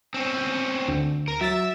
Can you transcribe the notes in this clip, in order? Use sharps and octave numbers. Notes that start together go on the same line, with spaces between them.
C4 C#4
D2
A#4
F#3 E5 A6 E7